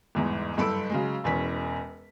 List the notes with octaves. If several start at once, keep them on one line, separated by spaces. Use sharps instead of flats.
G1 E2 G#2
F#1 G2 A4 B5 E6 D7
C#3 F#3 G#3
E1 E2 C#4 B6